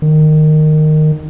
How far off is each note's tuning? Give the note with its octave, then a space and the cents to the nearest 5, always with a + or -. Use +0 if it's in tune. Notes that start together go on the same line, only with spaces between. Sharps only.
D#3 -15